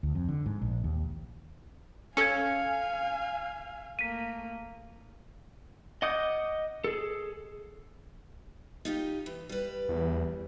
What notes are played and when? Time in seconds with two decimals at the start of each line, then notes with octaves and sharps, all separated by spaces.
0.03 D2
0.15 F2
0.28 D3
0.46 G#2
0.61 A#1
0.84 D#2
2.17 C#4 A4 F5 G#5 G#6 C#7
3.99 A3 A#3 B6 D#7
6.02 D#5 F#5 D6 D#6 G6
6.84 G#4 A4
8.85 D#4 F4 G4
9.26 E3
9.49 G3 B4
9.89 E2